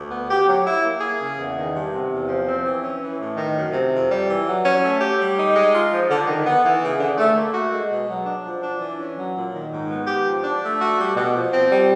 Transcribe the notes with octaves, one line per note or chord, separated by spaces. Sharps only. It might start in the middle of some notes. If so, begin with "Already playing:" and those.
Already playing: D2
B3
G4
F#3
E4
A#3
G#4
C#3
E2
D#3
G2
C3
E2
F3
C4
E3
C#4
E3
A2
D#3
F#2
C3
F2
G3
E3
F#3
C#4
A3
G4
G3
D#4
G#3
F4
F3
D3
D#3
B3
E3
C#3
D3
A3
A#3
F#4
G#3
B2
F#3
D4
F3
D4
E3
C#4
F#3
A#2
D#3
G#2
B3
G4
F3
D4
A3
F#4
G3
B2
F3
C4
G3